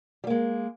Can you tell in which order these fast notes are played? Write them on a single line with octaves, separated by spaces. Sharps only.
G3 A#3 G#3